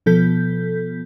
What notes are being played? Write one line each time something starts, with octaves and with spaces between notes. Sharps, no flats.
B2 F3 B3 A4 G6 B6